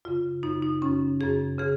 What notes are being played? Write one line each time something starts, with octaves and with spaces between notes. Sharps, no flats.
F#2 C#3 F4
F#2 C#3 D#4
D#4
F#2 C#3 C#4
F#2 C#3 G#4
C#3 G#4